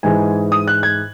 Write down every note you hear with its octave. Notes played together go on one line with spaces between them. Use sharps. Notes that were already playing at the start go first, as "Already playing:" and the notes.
G#2 E3 G#3 G#5
D#6
F#6
G#6